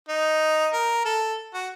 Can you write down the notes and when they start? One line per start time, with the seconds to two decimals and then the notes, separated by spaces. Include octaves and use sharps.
0.09 D#4
0.73 A#4
1.05 A4
1.54 F#4